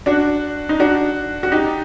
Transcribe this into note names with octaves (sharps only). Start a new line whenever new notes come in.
D4 F#4
D#4
D4 F#4
F#4
D#4 G4